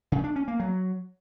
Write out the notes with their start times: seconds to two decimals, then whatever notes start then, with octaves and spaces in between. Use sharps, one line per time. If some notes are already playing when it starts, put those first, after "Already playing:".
0.12 C#3
0.24 D4
0.36 C#4
0.48 A#3
0.60 F#3